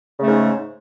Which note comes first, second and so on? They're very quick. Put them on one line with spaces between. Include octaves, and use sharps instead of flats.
C#3 A3 G#2